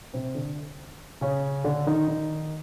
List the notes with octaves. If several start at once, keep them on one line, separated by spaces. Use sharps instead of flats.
C3 C4
D3 D4
C#3 C#4
D3 D4
D#3 D#4
D#3 D#4